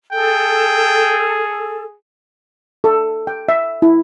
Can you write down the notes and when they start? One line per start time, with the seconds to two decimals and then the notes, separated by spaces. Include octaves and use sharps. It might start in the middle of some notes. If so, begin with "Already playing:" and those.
0.13 G#4 A4 G5
2.84 A4
3.27 G5
3.49 E5
3.82 E4